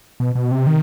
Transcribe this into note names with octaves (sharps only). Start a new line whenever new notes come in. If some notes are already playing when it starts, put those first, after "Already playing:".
B2
B2
C3
D#3